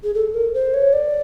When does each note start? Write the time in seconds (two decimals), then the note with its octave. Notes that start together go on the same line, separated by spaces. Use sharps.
0.03 G#4
0.14 A4
0.34 A#4
0.54 C5
0.74 C#5
0.93 D5